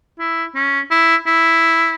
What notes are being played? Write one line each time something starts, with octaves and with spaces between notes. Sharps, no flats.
E4
C#4
E4
E4